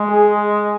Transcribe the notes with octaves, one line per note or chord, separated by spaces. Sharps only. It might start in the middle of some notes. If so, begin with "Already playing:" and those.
Already playing: G#3
G#4